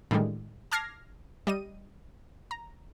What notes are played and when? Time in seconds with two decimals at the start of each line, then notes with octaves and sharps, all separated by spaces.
0.11 A2 D3 D#3 G3 G#3
0.72 A5 D6 F6 G#6 A#6 C7
1.47 G3 D#5 D#7
2.51 A#5